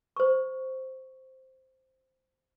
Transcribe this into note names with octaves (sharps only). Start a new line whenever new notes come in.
C5 C#6